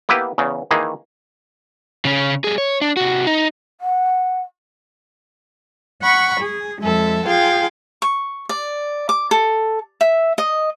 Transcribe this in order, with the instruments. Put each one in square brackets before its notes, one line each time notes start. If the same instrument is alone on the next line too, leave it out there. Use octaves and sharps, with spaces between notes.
[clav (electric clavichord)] A#3 B3 E4 G4 B4
E2 C#3
D#3 E3 A#3 D#4 G#4
[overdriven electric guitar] C#3 C#4
G3 G#4
C#5
D4
C3 F#4
D#4
[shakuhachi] F#5
[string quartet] F#5 B5 C#6
G#4
F2 G#3 A4 E5
F4 G#4 F5 G5
[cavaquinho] C#6
D5
D6
A4
E5
D#5